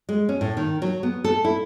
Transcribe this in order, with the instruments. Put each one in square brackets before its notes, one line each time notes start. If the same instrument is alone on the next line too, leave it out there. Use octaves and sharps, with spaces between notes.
[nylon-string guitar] G#3
C#4
A2
D#3
F#3
B3
A4
E4